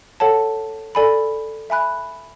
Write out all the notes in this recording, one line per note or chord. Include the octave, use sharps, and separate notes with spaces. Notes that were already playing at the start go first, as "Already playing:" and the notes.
A4 C#5 F#5 A5
A4 D5 G#5 B5
E5 G#5 B5 F#6